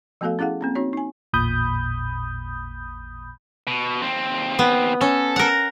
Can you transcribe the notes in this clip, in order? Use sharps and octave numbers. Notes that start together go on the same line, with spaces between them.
F3 A3 B3 F#4 A4 F5
C#4 E4 G#4 F5 F#5
A#3 C4 C#4
C4 D#4 F#4 C#5
D#4 G#5
A1 E2 A#2 B5 D#6 G6
B2
D#2 C4
B3
C#4 A4
A#4 F#5